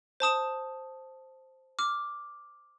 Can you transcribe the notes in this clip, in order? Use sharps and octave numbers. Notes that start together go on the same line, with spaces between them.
C5 A5 D#6 E7
D6 F6